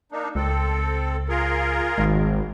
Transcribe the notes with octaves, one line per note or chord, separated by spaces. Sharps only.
A#3 D4 D#4
C#2 C4 A4
F4 G#4 A#4
G#1 G#3